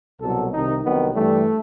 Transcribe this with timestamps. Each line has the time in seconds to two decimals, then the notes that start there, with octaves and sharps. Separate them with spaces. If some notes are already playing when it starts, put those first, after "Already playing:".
0.20 C2 B2 F#3 A4
0.52 C2 C3 D#3 D#4
0.83 C2 C3 D#3 F#3 B3
1.14 G2 E3 G3 A3